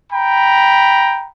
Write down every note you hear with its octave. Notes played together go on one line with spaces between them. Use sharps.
G5 A#5 B5